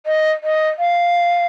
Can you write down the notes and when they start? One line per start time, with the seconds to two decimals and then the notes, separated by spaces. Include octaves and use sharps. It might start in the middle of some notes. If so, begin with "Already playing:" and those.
0.06 D#5
0.43 D#5
0.79 F5